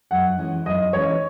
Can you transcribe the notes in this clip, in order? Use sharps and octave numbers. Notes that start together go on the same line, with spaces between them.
F#2 F#5
E3 G#3 C#4
F#2 D#5
E3 G#3 C#4 C#5